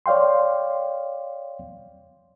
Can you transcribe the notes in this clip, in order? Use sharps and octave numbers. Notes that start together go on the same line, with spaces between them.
C#5 D5 F5 G5 C6